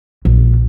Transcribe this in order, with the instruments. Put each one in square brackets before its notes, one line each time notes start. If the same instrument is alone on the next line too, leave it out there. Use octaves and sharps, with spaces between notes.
[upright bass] A#1